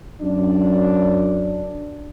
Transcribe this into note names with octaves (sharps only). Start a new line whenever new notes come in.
F#2 D4